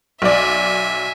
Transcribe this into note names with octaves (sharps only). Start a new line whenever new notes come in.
B1 D5 E5 G#5